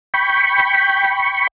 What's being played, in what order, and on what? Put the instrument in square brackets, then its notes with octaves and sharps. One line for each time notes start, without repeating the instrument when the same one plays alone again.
[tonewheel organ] G5 B5 C#6